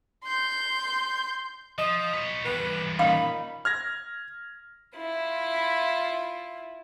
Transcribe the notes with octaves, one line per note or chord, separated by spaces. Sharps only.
C6 G6
F3 D#5
B4 C#5
E3 G3 B4
A#2 C#4 D#4 F5 B5
F6 G#6 A#6
E4 F4